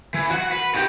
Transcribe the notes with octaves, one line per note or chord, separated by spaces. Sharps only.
E3
F#4 F#5
B4
F#4 G4